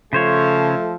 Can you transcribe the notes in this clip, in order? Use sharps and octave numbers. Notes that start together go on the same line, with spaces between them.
C#3 F3 A3 A4 C5 C#5